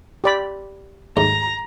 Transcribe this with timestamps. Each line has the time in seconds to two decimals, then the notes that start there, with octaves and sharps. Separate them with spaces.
0.24 G4 D5 B5
1.17 D#2 G#2 A3 A#5